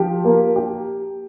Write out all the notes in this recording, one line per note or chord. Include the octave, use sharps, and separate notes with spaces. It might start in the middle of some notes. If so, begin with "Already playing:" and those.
Already playing: F3 G4
A#3
G4